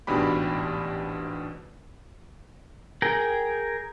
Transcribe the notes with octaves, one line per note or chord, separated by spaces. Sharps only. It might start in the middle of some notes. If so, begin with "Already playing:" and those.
A1 G#2 B2 D4 G4 B5
G#4 A#4 G5